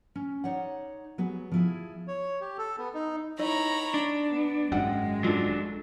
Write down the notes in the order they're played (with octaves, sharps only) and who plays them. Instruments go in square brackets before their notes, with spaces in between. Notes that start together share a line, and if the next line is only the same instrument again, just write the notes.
[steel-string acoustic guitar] C#4
D#4 C#5 D5 F#5
F#3 B3 G#4
F3 E4 G#4
[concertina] C#5
G4
A4
B3
D#4
[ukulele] D#4 E4 D#5 [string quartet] C#5 A#5 B5
[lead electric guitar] D4
[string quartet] B3
[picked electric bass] G#1 F#2 [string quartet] G#3 [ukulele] F#5 G5
[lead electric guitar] F#3 D4 [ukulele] F4 A4